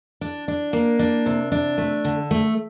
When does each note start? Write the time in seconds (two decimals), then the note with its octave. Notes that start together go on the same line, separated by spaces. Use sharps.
0.21 D4
0.48 D4
0.73 A#3
0.99 D4
1.26 C3
1.52 D4
1.78 A3
2.05 D3
2.31 A3